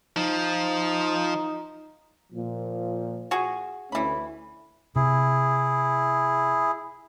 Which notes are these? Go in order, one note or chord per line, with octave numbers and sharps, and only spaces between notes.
F3 D#4
A#2 F3
F#4 G#4
D2 E3 A3 C#4 B5
C3 E4 G#4